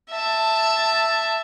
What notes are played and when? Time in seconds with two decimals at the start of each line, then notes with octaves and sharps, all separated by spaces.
0.11 E5 A5